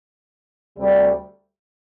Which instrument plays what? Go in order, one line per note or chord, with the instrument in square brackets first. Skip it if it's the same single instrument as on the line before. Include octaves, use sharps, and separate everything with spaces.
[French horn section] D2 C3 G3